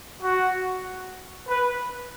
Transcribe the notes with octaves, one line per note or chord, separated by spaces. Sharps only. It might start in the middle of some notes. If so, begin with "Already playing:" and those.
F#4
B4